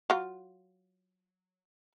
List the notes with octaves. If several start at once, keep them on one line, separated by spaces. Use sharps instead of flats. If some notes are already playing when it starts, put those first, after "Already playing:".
F#3 F4